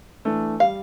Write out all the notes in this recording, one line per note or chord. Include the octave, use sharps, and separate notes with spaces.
E3 A3 D4
G3 F5